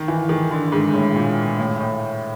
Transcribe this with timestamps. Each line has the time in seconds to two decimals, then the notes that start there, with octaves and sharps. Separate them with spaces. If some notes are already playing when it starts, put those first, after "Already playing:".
Already playing: D#3
0.08 E3
0.29 D#3
0.51 D3
0.72 G#2
0.94 A2
1.16 A#2
1.59 A2
1.80 A2